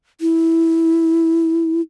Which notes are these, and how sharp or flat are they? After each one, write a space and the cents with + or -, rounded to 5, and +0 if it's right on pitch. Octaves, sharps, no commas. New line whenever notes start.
E4 -5